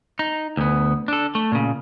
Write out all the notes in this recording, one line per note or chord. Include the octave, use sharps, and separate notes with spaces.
D#4
D2 B3
D4 A4
A3
A#2 C#3